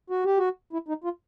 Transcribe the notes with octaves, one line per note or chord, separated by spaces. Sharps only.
F#4
G4
F#4
E4
D#4
F4